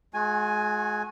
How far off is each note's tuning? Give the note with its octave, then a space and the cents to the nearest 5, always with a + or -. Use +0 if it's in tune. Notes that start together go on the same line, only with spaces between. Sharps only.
G#3 +30 F#4 -30 G#5 +0